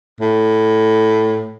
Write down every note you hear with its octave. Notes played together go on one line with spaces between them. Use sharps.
A2